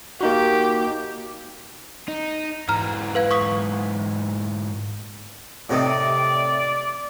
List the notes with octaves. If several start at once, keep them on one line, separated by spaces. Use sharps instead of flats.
A#3 D#4 F#4 G4
D#4
G#2 E3 A#5 F6
B4 F5 G#6
C#6 D#6 B6
A2 C3 D#3 D5